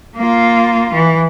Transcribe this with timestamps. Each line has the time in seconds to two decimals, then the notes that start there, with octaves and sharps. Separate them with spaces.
0.16 A#3 F4
0.94 E3